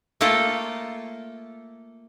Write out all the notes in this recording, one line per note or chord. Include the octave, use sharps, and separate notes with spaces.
A3 A#3 F4 A4 G5